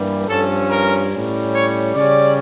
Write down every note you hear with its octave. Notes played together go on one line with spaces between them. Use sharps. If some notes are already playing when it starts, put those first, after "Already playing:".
Already playing: G2 E3 G3 A#3
G2 F3 C#4 A4
A#4
A2 G3 C#4
C#5
C#3 G3 C#4 D5